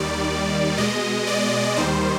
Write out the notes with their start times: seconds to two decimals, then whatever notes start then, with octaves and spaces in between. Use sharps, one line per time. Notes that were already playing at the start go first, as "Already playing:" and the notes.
Already playing: D#2 D#3 G3 D5
0.77 B2 G#3 D#5
1.27 D5
1.76 D#2 D#3 G3 C5